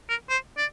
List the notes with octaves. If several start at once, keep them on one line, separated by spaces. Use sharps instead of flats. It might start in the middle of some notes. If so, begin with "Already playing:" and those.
A#4
C5
D5